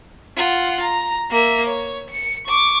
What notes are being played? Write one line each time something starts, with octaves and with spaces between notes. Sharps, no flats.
F4 F#5
A#5
A#3 E5
C#5
C#7
C#6 D6